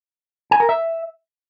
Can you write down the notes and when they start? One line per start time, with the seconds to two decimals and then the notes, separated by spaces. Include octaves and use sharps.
0.51 G#5
0.60 A#4
0.69 E5